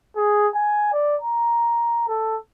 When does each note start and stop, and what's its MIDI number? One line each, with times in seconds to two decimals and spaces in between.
0.16 0.47 68
0.55 0.90 80
0.93 1.16 74
1.22 2.07 82
2.08 2.38 69